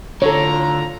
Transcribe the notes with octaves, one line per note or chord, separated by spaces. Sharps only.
A2 D3 F4 A4 C#5 A#5